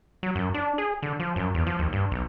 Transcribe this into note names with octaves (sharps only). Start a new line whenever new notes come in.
F#3
F#2
D4
G#4
D3
F3
F#2
E2
F3
D#2
G2
B1